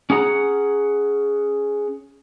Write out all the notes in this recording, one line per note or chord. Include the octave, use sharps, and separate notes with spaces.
C#4 G#4 F#5 A#5